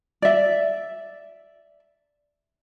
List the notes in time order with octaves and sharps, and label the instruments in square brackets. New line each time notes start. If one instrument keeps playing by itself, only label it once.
[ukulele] D5 E5